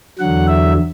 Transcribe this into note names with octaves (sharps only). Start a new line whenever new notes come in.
E2 D3 F#3 F#5
E5